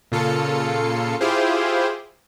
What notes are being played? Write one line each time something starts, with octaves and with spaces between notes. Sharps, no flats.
A#2 C#3 F4 A4 C#7
E4 F4 G4 G#4 C5